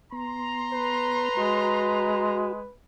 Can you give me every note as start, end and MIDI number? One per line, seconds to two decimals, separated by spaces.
0.12 1.29 59
0.12 2.38 82
0.12 2.38 84
0.73 2.73 71
1.37 2.68 56
1.37 2.53 66